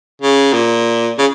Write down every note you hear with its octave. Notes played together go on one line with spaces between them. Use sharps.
C#3
A#2
C#3